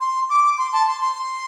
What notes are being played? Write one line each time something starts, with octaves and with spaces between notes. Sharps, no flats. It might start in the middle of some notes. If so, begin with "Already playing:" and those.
C6
D6
C6
A5
C6
C6